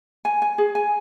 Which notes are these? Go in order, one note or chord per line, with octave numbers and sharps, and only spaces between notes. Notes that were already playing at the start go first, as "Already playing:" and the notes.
G#5
G#5
G#4
G#5